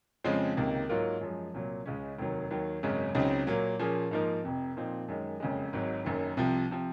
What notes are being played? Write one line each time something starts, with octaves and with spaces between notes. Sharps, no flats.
F2 C#3 F3 G#3 C4
C#2 C3 D#3 A#3
G#2 F#3 A#3 F4 A#4
F#2 F3 G#3
C2 A#2 F#3 A#3
C#2 C#3 G#3 C#4
F1 D#2 D#3 F#3
D#2 D#3 F#3
G#1 F#2 C#3 G#3 C#4
C#2 C#3 F#3 C4 D#4
A#2 F#3 A#3
A#2 F3 A#3 C#4 G#4
G#2 F3 A#3 D#4 A#4
F1 F2 C3
A#2 F3 C4 D#4
F#2 D#3 G#3
F#1 F2 C#3 G#3
G#1 G#2 F#3
F#1 F#2 D#3
C2 C3 F3
C3 F3